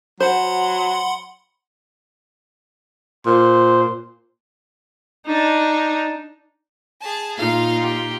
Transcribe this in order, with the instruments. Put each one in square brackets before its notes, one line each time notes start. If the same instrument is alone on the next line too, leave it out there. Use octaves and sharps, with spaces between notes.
[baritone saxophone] F#3 [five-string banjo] C5 [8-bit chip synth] F#5 B5 C6
[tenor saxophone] A#2 [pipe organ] C5
[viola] D4 D#4
[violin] G#4 A5
[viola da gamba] A#2 D#4 F4 [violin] F5
[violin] G4